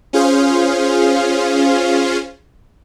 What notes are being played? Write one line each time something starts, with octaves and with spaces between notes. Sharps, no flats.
C#4 F4 G#4 C5 F5